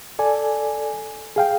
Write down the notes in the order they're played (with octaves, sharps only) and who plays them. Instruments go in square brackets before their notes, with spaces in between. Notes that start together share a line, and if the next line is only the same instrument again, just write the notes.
[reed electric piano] A4 D5 G#5
G#4 F5 G5